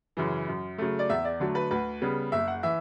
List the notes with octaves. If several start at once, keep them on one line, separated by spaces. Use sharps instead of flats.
F#2 C#3 E3
F#2
C#3 F#3 A3
D5
E2 E5
D5
D3 F#3 A3
B4
D2 B4
C#3 G3 B3
F#1 E5
F#5
E3 E5